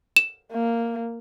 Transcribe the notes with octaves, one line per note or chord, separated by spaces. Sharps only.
E7
A#3